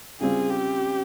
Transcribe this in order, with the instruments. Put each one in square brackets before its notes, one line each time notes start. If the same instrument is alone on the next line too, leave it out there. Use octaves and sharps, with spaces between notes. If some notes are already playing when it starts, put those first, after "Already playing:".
[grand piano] C#3 G3 C4 F4 [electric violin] G#4
[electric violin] G4